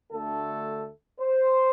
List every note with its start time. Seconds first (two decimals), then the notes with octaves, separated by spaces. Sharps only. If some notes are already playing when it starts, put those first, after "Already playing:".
0.12 D2 D3 A3 A4
1.21 C5